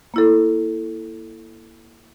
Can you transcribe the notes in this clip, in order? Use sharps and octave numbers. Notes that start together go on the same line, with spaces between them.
A#3 E4 A4